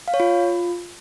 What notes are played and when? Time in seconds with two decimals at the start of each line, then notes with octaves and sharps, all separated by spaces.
0.08 F5
0.14 C#5
0.20 F4